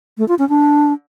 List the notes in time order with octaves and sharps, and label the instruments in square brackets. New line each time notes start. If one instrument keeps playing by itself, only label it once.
[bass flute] A3
F4
C#4
D4